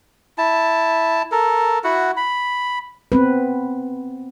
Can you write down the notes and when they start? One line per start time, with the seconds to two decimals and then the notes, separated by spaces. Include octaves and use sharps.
0.38 E4 A5
1.32 A4 A#4
1.84 E4 F#4 F#5
2.17 B5
3.12 B3 C4 B4